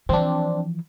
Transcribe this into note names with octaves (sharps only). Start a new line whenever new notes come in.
E3 F3 C4 D4